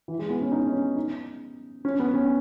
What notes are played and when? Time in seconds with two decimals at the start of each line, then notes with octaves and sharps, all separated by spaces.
0.08 E3
0.19 G#3
0.30 B3
0.42 C#4
0.52 D#4
0.67 C#4
0.96 D#4
1.85 C#4
2.00 B3
2.14 C#4